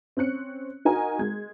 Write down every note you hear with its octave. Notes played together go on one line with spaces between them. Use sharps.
C4 C#4 F#6 C#7
D#4 F#4 A#4 G#5 A#5
G#3 G#6